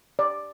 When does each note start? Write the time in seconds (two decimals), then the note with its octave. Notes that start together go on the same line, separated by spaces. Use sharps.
0.19 D5